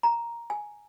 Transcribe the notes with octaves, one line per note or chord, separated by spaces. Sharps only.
A#5
G#5